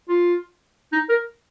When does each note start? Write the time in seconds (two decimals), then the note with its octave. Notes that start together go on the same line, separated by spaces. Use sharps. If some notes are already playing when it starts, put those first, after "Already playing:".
0.09 F4
0.92 D#4
1.09 A#4